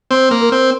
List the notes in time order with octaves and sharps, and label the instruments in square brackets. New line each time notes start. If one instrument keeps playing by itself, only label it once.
[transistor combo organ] C4 [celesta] C6
[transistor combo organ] A#3
[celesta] A#4
[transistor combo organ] C4